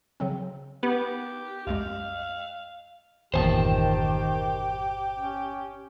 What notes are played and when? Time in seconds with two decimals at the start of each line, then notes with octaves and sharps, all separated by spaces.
0.20 C#3 F#3 C4
0.83 B3 G4
1.67 C2 F#2 G#3 F5
3.34 G1 E2 A#2 D#3 G4 C5 G#5 A5
5.19 C#4